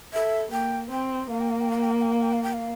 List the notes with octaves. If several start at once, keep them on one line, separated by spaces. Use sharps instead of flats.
A4 E5
A#3 G5
C4 G5
A#3 F5
G5
F5
G5
F5
G5
F5
G5
F5
G5
F5
G5
F5